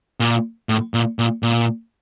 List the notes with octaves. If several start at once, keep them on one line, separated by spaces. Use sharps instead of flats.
A#2
A2
A#2
A#2
A#2